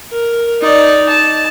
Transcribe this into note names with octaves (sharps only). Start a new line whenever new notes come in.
A#4
D#4 D5
A5